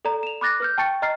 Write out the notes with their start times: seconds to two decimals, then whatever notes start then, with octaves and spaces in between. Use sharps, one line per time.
0.05 A4 D5 A#5
0.23 E7 F7
0.41 B5 D6 F#6 A6 A#6
0.60 B4 F6 G6
0.78 G5 A5 C#6 A6 C#7
1.02 D#5 A#5 F6 A6 C7